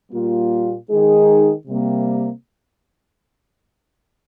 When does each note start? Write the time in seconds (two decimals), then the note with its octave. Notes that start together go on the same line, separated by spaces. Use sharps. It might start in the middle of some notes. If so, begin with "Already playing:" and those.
0.12 A#2 G3 A#3 F4
0.90 D#3 G#3 D#4 G#4
1.67 C3 G3 A#3